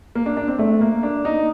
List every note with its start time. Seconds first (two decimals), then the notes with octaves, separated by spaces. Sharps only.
0.15 A#3
0.26 D4
0.37 D4
0.48 C4
0.59 A3
0.81 A#3
1.03 D4
1.25 D#4